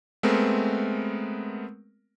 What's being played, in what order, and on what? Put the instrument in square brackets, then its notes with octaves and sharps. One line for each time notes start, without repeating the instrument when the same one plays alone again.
[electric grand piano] G#3 A3 B3 C4 A#4